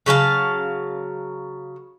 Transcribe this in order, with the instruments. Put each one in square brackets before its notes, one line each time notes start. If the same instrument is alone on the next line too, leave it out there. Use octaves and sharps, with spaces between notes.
[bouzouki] C#3 F#3 F5 A5